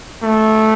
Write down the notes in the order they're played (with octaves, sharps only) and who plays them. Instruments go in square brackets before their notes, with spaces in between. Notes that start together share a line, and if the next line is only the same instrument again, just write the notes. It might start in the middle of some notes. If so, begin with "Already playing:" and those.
[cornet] A3